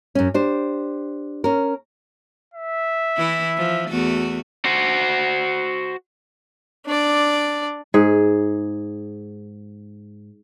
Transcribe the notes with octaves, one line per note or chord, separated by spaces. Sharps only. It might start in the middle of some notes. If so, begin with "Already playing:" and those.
F#2 C#4
D4 G4 C5
C#4 A#4
E5
E3 E4
F3
E2 A3 F#4
F#4 C5
D4 D5
G#2 G#4